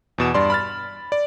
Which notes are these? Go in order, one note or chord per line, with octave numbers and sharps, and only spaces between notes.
E2 B2 E7
G2 D5 C6
B5 F6 A6
D5